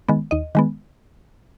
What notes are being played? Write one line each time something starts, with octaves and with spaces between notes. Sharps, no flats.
D#3 G#3 B3
D#2 D#5
D#3 G#3 B3